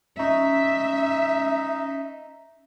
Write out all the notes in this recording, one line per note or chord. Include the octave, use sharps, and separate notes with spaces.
C#4 D#4 E5